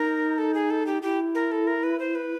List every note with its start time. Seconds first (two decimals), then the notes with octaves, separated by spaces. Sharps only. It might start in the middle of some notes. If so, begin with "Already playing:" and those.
Already playing: D#4 A#4
0.38 A4
0.54 G#4
0.70 A4
0.86 G4
1.02 E4 G4
1.35 A#4
1.52 A4
1.67 A#4
1.83 B4
1.99 C5
2.15 B4